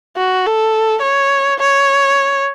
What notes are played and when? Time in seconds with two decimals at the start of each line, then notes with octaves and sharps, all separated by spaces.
0.17 F#4
0.46 A4
1.02 C#5
1.60 C#5